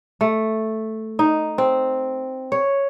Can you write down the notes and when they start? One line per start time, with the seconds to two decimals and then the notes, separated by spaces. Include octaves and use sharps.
0.21 A3
1.19 D#4
1.58 C4
2.52 C#5